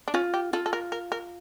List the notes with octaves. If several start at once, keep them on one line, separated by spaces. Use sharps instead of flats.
D4
C#4 F4
G4
F4 A4
A4
A#4
A#4
A#4